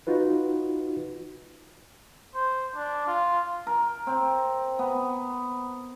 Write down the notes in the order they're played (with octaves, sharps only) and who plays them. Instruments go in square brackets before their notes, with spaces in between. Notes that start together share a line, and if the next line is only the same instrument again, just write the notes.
[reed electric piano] D#4 F4 F#4 B4
[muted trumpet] C5
D4
F4
[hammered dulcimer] A#4
C4
B3